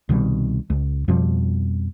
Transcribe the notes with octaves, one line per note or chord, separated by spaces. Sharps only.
C2 B2 D#3 G3
C#2
F2 B2 F3 G3